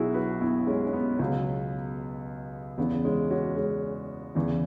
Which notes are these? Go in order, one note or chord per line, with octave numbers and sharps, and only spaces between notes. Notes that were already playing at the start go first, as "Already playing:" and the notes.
Already playing: B1 B2 F#3 E4 F#4 G#4
F#4 B4
B3 E4
G#3 C#4
C#4
B3
C#2 B2 F#3
E2 C#3 E3 B3
G#3 C#4
C#4 F#4
G#3 C#4
E2 C#3 E3